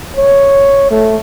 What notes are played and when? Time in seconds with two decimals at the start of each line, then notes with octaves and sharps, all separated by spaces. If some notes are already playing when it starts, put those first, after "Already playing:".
0.17 C#5
0.91 A3